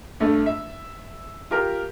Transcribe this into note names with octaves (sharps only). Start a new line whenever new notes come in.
G2 A3
E5
F4 G4 A#4